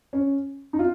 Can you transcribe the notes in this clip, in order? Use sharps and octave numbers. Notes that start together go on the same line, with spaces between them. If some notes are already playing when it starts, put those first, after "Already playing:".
C#4
D#4
F4